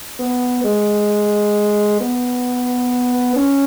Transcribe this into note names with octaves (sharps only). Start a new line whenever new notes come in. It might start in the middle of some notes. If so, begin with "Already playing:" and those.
B3
G#3
B3
C#4